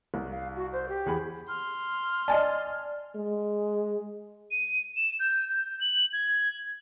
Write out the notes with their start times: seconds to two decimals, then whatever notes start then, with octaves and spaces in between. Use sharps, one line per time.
0.14 C2
0.31 F5
0.56 F#4
0.73 C5
0.89 G4
1.06 E2 G#4 B5
1.49 C6 F6
2.28 D5 D#5 G#5 A5
3.16 G#3
4.51 D#7
4.96 E7
5.20 G6
5.49 G6
5.81 F#7
6.13 G#6